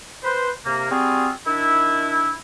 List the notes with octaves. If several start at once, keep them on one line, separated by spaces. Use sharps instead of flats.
B4 C5
C3 A#3
G3 C4 F4 F#4 G#4
D#3 D4 E4